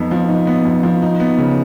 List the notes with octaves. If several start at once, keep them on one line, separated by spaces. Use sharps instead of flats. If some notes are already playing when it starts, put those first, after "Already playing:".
Already playing: F2 B3 D#4
F3
D#4
B3
F2
F3
D#4
B3
C#3